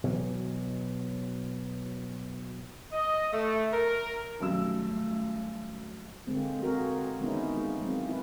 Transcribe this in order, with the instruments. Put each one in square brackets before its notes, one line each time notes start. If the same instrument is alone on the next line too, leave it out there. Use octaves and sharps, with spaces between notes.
[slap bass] B2 E3 F#3
[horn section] D#5
A3
A#4
[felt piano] B1 F#2 E6 [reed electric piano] D#3 G3 C#4 [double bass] A3
[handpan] D3 G#3 A#3 C4
A#3 C4 F#4 G#4 A#4
D#3 G#3 B3 C#4 D#4 E4
G#3 F4
F#3 G#3 A#3 C4
E4 F4 B4